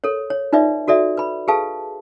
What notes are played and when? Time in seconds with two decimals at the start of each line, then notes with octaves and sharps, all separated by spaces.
0.04 A4 A#4 C#5
0.30 C#5
0.53 D#4 F4 B4 D5 E5
0.88 F#4 A4 D5 E5
1.17 B4 B5
1.48 G#4 A4 B4 F5 A5